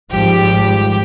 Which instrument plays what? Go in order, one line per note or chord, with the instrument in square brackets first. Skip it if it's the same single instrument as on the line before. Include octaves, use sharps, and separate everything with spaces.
[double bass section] G#1 F3 G3 [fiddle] G4